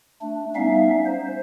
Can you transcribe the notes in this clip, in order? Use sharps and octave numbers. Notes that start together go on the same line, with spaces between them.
A3 D4
G3 B3 C#4 D#4 E5 F5
C5